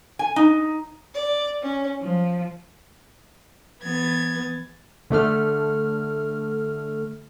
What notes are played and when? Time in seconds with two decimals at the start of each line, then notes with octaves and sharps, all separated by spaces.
0.19 G#5
0.36 D#4
1.14 D5
1.62 C#4
2.01 F3
3.82 E3 B3 G#6 A6
5.10 D3 A3 A4 F6